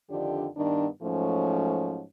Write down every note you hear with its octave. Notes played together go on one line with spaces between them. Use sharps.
F2 D3 D#3 F3 D4 G4
G2 D#3 B3 D4
G#2 F3 F#3 A3 C#4